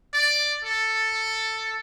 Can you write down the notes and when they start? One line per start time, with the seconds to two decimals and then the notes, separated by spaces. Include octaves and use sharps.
0.14 D5
0.64 A4